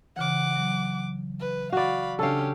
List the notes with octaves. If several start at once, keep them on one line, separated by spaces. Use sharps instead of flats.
C#3 E3 F#5 D6
F#3
B4
F#4 D5 F5 B5
C#3 C#4 D4 G4 A4 F5